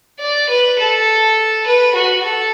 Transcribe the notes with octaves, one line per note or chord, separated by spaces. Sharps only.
D5
B4
A4
B4
F#4
A4